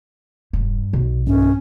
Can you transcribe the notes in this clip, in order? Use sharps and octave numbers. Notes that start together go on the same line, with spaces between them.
E1 G2
B1 B2
G2 C#4